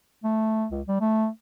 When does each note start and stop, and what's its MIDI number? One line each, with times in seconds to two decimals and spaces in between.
0.24 0.66 57
0.71 0.81 37
0.88 0.97 55
1.01 1.27 57